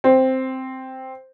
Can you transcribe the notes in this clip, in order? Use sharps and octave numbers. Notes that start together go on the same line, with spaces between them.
C4